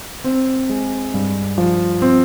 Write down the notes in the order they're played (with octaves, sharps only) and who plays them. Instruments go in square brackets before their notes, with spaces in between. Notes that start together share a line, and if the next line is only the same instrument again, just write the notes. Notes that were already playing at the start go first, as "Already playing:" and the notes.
[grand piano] C4
G#3
G2
F3
C4